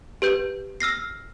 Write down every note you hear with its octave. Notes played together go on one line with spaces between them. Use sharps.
G4 B4 G6
E6 F6 A#6 C7